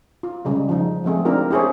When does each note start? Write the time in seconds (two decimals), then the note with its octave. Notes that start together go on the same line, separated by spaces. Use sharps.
0.23 F4
0.45 C#3 G3 G#3
0.69 F3 D#4
1.04 F3 G#3 A3 C4 G#4
1.25 C4 D4 D#4 F4 G4 A#4
1.51 E4 G4 G#4 C5 C#5